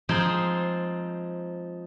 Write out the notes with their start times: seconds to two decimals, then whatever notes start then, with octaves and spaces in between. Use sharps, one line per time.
0.09 F3 G#3 C4 D#4 G#4 C5